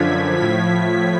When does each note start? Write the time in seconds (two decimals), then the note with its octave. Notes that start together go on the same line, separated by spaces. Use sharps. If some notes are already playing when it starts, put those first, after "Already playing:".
Already playing: F#2 D3 F3 G#6 B6
0.36 A2 F3 G#6 B6